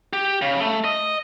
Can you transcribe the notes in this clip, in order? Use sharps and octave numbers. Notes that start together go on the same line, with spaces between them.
G4
C#3
A3
D#5